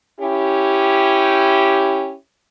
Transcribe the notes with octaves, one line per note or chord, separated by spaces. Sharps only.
C#4 E4 G4